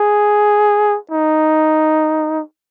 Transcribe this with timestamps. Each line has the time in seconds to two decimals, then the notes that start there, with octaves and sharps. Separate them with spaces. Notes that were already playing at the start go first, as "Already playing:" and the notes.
Already playing: G#4
1.11 D#4